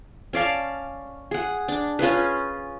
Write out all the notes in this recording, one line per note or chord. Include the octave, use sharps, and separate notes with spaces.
C#4 D5 F5 A5
G#4 F#5
D4
C#4 F4 G#4 B4